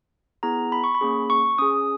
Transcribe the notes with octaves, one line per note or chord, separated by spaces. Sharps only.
B3 E4 G#4 A#5
B5
C#6
B5
A#3 C#4 G#4
C#6
C#4 G#4 D#6